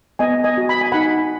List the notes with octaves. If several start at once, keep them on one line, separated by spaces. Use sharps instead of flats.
B3 D#5 G#5
D#5 G#5
F#4
B5
G#5
D#4 F#5 B5